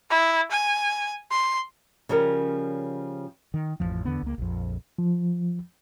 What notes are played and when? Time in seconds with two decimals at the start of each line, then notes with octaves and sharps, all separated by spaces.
0.10 E4
0.51 G#5
1.31 C6
2.09 C#3 F3 G3 C#4 A#4
3.54 D#3
3.80 A1 F2 A2 F3
4.05 E2 D3 B3
4.22 C#2 A#3
4.38 A#1 F2
4.99 F3